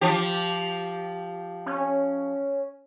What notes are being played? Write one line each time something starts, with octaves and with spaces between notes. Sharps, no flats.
F3 G4
C#4